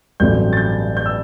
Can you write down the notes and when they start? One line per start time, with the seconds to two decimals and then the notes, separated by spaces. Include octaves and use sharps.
0.20 A1 G2 F#3 A3 C4 G6
0.53 A6
0.57 G6
0.97 G6
1.06 E6